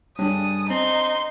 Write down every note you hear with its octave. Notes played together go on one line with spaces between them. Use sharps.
G2 C#4 D4 D#6
C4 D#4 C6